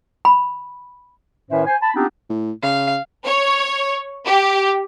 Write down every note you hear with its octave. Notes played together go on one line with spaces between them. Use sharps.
B5
A2 D#3 C#4 B4 C5 E5
C5 G#5
A5 B5
B3 C4 D4 D#4 F4 G4
A2
C#3 F5
C#5
G4